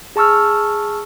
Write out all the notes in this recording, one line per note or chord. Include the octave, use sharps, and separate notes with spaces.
G#4 A5 C#6 E6 F6